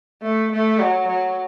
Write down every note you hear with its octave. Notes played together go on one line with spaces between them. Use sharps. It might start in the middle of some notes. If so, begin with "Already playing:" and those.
A3
A3
F#3
F#3